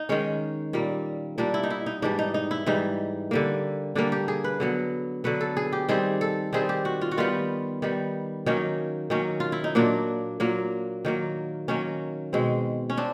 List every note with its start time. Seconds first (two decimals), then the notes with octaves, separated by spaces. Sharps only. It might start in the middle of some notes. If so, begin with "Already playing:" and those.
Already playing: D#4
0.09 D#3 G#3 C#4
0.73 A#2 G3 A#3
1.38 A#2 G3 A#3 D4
1.54 E4
1.63 D#4
1.70 E4
1.86 D#4
2.02 G#2 E3 G3 D4
2.19 D#4
2.34 D#4
2.51 E4
2.66 G#2 E3 G3 D#4
3.31 D3 G3 A#3
3.95 D3 G3 A#3 D4
4.12 G4
4.28 G#4
4.44 B4
4.60 D3 F#3 B3
5.24 D3 F#3 B3 B4
5.41 A4
5.57 G#4
5.73 G4
5.89 D#3 G3 C4 G#4
6.21 A4
6.53 D#3 G3 C4 G#4
6.69 G4
6.85 F#4
7.01 F4
7.11 F#4
7.17 D#3 G3 B3 F4
7.82 D#3 G3 B3
8.46 D#3 F#3 A#3 C#4 D#4
9.10 D#3 F#3 A#3 C#4
9.40 F4
9.52 E4
9.64 D#4
9.75 A#2 F#3 A#3 D4
10.40 A#2 F#3 A#3
11.05 D#3 F#3 A#3
11.68 D#3 F#3 A#3 C#4
12.33 B2 G#3 C4
12.90 C#4
12.97 C4 D4